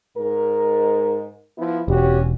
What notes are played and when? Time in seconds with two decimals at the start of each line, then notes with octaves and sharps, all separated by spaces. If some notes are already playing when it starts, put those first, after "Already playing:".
0.17 G#2 A#4
1.58 F3 B3 E4
1.88 E1 C#4 F#4 G4